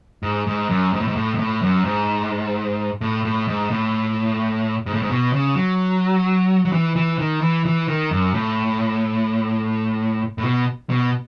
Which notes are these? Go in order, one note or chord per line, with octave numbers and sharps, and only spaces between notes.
G#2
G#2
F#2
G#2
A2
G#2
A2
G#2
A2
F#2
G#2
A2
A2
G#2
A2
G#2
A2
G#2
B2
C#3
F#3
F#3
E3
E3
D#3
E3
E3
D#3
F#2
A2
A2
B2
B2